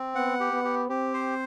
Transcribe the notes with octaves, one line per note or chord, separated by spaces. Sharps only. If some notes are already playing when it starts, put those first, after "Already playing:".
Already playing: C4
B3 F#5
G4
B3
G4
C4 G4
C5